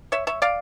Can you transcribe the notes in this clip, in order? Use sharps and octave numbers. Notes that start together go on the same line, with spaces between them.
C#5 E5
C#5 E5
D5 F5